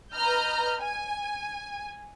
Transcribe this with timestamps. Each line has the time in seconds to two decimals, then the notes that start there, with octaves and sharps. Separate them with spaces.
0.14 B4 D#5 A#5 F6 G6
0.80 G#5